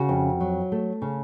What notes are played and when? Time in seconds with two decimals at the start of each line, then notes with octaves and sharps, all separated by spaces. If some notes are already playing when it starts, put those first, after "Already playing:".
Already playing: C#3 F#4
0.09 F2
0.40 F#3
0.72 A3
1.02 C#3